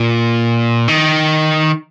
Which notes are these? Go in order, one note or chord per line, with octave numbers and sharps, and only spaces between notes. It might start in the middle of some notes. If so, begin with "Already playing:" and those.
Already playing: A#2
D#3